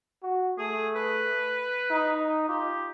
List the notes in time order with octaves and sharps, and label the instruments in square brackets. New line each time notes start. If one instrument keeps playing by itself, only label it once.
[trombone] F#4
[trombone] A3 [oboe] G#4
[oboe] B4
[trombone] D#4
[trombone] F4 [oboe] G4